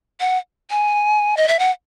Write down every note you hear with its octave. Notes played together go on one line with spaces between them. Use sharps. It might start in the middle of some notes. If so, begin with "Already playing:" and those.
F#5
G#5
D#5
E5
F#5